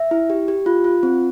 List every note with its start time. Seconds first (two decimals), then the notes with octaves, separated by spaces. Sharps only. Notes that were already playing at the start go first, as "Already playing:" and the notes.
Already playing: E5
0.11 E4
0.30 G4
0.48 G4
0.66 F4
0.84 F4
1.03 C4